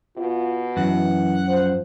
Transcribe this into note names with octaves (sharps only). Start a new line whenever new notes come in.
B2 F4
F#2 E3 F#5
F3 C5